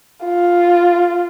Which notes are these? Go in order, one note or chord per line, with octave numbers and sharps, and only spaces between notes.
F4